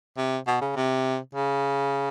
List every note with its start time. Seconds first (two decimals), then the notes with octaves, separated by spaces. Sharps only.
0.17 C3
0.47 B2
0.61 C#3
0.76 C3
1.34 C#3